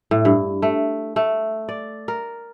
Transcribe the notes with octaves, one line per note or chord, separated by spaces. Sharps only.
A2
G2
A3
A3
D5
A#4